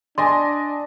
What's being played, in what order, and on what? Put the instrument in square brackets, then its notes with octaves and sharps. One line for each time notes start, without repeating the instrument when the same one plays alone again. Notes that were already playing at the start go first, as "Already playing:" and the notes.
[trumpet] D4 [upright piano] D5 D#5 G#5 [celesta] C6